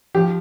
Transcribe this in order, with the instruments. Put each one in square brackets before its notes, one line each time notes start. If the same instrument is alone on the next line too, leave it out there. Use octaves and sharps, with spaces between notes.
[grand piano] F3 G4